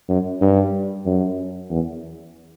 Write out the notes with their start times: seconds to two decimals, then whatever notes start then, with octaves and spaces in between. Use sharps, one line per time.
0.09 F#2
0.41 G2
1.06 F#2
1.70 E2